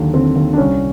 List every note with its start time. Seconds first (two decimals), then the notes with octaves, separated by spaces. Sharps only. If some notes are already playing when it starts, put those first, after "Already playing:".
Already playing: D#2 D3 F#3
0.14 D3 C4
0.36 D#2
0.53 D4
0.58 C2 C#4